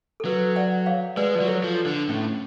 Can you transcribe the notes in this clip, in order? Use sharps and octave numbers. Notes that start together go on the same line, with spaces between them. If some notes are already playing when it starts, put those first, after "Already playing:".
A4
F#3 B4
D5 F#5
C#5 F5
G#3 B4 D5
F3
F#3 D5
A4 C#5
F3
D3
A2 C#4